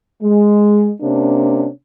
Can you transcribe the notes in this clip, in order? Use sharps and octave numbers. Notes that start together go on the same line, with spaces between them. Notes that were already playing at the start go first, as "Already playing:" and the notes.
G#3
C3 A#3 C#4 D4